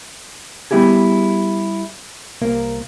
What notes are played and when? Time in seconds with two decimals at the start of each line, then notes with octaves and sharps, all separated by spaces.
0.71 G3 B3 E4 G4 G#4
2.41 C2 A#3 A#4 F5